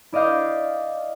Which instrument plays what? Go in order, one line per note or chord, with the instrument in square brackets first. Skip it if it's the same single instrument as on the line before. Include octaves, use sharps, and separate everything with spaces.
[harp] E4 D5 D#5 F5 G6